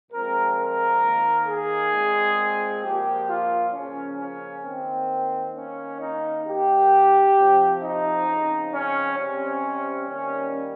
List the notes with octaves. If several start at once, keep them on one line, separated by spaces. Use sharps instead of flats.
A#2 F3 G#3 C4 A#4
A#4
D#3 A#3
G#4
A#2 G#3 C4
A#2 F3 A#3 G4
F4
C#3 F3 A#3 C#4
C#4
D#3 A#3 C4
D#3 A#3 C#4
D#4
D#3 A#3 G4
C3 F3 C4
D#4
C#3 F3 C4
C#4
C3 G3 C4 C#4
D#3 G3 A#3 C#4